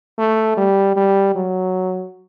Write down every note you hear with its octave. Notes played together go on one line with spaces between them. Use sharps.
A3
G3
G3
F#3